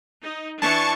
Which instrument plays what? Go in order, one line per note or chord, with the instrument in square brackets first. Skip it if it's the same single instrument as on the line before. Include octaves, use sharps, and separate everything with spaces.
[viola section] D#4
[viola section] E3 D4 [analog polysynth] A5 C#6 C#7